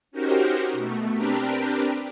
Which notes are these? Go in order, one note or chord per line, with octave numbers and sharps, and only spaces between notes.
C#4 D#4 F#4 G4 A#4 C5
B2 A3
C4 D4 G4 A#4 B4